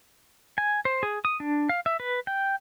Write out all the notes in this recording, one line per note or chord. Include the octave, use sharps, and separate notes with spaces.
G#5
C5
G#4
D#6
D4
F5
E5
B4
G5